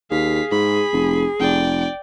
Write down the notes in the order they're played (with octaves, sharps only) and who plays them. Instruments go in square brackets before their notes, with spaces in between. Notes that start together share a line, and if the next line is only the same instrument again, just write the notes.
[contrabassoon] D#2 [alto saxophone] G#4 [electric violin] F5 B6
[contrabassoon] G#2 [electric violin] B5
[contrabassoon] F1
[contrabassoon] F1 [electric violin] D5 G5